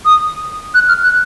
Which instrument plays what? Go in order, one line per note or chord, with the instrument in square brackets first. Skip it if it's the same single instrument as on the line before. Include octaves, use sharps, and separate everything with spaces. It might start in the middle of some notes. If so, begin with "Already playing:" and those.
[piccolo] D#6
F#6
F6
F#6